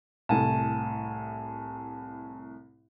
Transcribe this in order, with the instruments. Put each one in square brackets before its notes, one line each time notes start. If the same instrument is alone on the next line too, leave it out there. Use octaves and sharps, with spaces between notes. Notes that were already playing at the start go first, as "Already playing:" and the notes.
[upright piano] C2 A2 [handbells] G#5 A5